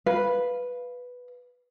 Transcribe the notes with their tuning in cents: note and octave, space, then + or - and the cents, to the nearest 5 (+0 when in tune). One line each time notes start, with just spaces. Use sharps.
B4 +0 F5 +0